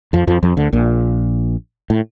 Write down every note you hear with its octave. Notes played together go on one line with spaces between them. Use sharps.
F2 F3
F2 F3
F2 F3
D2 D3
A#1 A#2
A2